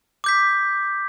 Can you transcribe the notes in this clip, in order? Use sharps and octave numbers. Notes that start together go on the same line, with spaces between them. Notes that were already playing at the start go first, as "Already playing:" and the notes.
D6 G6 B6